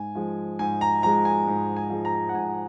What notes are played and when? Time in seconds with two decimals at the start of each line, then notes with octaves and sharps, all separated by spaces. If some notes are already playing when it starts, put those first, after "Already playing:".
Already playing: G#2 G#5
0.15 F3 G#3
0.59 G#2 G#5
0.81 A#5
1.03 F3 G#3 A#5
1.25 G#5
1.47 G#2
1.76 G#5
1.90 F3 G#3
2.05 A#5
2.29 F#5
2.35 G#2 G#5